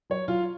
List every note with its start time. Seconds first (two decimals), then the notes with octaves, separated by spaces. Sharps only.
0.10 F#3 C#5
0.28 F#3 F4 F5